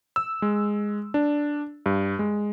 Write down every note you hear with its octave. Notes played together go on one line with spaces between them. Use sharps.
E6
G#3
D4
G2
G#3